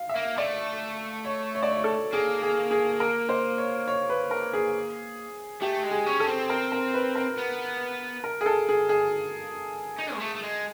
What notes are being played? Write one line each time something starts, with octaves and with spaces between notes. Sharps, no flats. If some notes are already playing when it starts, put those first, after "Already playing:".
Already playing: F5
E5
A#3
A3 D5
C#5
C#5
D5
C#5
A4
A#3 G#4
G#4
G#4
A#4
C5
C#5
C#5
B4
A#4
G#4
A3 G4
G#3
G#4
C#4
A4
C4
A#4
A#4
B4
A#4
B3
A#4
G#4
A4
G#4
G#4
D#4
G#3
A3
A3
G#3